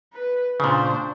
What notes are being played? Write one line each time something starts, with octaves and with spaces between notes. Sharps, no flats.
B4
A#2 C#3 D4 C5